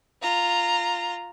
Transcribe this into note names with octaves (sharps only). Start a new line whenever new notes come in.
F4 A#5